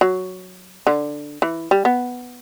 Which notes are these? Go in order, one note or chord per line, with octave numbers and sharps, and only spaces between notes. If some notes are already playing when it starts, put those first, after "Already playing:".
F#3
D3
E3
G3
B3